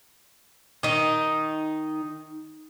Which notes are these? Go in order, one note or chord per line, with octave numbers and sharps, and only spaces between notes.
D#3 D#4